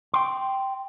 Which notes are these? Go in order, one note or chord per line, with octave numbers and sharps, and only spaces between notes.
G5 C6